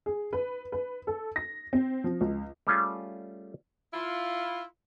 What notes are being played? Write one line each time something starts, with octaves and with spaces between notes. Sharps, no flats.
G#4
B4
B4
A4
A#6
C4
F3
C#2
G3 A3 C#4 F4 G#4
E4 F4